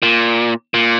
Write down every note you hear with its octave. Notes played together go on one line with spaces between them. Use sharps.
A#2
A#2